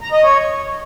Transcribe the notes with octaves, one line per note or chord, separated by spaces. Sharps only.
A#5
D#5
C#5